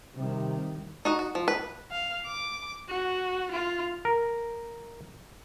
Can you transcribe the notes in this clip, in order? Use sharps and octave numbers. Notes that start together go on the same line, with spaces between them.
C3 D#3 G3
D#4 F#4 D#5
F#4
F3
B4
F5
D6
F#4
F4
A#4